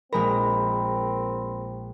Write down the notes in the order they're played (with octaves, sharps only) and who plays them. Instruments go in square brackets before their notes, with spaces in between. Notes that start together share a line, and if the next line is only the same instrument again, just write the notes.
[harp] A#1 G#3 A#5 [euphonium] C4 [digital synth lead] A#4 [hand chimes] B5